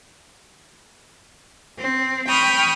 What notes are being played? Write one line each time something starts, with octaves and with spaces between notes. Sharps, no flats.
C4
G5 B5 C#6 D#6 F6